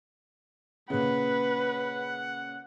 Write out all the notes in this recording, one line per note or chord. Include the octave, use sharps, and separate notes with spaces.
A#2 C#3 B4 F#5